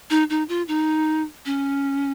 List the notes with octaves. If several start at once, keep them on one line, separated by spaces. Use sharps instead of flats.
D#4
D#4
F4
D#4
C#4